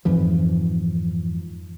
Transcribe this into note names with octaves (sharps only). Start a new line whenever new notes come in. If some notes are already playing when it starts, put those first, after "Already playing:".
F2 G#2 E3 F3